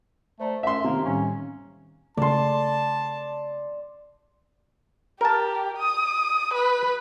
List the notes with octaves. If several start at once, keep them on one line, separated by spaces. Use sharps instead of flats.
A3 C5 D5 A#5
F#2 E5 C6
C3 D#3 A#3 C4 D#4
A2 D#3 G3 C#4
C#3 A3 D5 A5 C6
G4 A#4 A5
D#6
B4